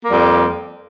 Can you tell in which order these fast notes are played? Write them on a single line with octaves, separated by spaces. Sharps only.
A#3 G3 F2